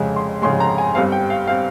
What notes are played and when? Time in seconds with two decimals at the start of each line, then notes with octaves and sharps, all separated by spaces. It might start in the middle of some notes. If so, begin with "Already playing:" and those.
Already playing: F1 F2 C#3 G#3
0.16 C6
0.42 F1 F2 C#3 G#3 C6
0.60 A#5
0.78 G#5
0.95 G1 G2 G3 C4 F5
1.12 G5
1.30 F5
1.47 G3 C4 F5